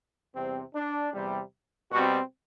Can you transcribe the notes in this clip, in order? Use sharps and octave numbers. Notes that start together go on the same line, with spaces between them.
E2 C3 G3 C4
D4
E2 C3 G3
B2 G3 C4 F#4